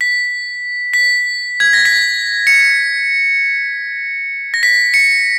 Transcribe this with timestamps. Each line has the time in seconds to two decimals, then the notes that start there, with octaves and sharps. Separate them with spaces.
0.01 B6
0.94 B6
1.60 G#6
1.73 A#6
1.85 B6
2.47 C#7
4.54 A#6
4.63 B6
4.94 C#7